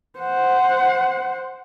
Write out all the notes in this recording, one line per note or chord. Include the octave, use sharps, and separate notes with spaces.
C5 F#5